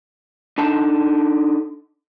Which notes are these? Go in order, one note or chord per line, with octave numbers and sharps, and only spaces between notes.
D4 D#4 A4 A5